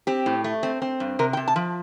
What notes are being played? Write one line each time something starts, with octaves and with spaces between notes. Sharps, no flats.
C4 G4
A2
A3
C4
C4
G2
C3 A#4
G5
C3
A5
F3